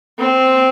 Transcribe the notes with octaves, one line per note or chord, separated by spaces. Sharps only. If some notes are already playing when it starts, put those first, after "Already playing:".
C4